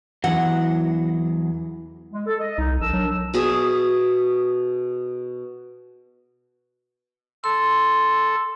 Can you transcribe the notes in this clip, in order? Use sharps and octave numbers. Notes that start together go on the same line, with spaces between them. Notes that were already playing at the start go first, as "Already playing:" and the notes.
E2 E3 F#3 F#5
G#3
A4
D#5
C2 D#4
A#1 D4 A#4 E6
F#3
B2 G#4 E5
A4 C6